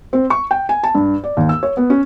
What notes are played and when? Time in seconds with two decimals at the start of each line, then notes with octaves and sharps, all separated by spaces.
0.13 C4
0.30 C#6
0.51 G5
0.69 G#5
0.83 A5
0.95 G2
1.24 D5
1.37 D#2
1.49 E6
1.63 C#5
1.77 B3
1.90 C#4